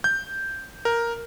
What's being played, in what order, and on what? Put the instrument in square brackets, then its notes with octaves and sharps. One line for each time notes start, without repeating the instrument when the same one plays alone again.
[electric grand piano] G6
A#4